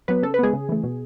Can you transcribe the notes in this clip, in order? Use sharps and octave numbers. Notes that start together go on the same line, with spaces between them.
F#3 B3 B4
C#3 A4
B4
G#3 B3 G#4
C#3
E3 A3
B2